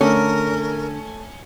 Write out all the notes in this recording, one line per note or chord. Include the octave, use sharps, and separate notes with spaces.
D3 A3 C#4 A#4